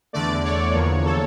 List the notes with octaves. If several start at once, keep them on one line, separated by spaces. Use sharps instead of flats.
E2 D3 A3 D5
C#5
E2 D3 F3 A#3
A4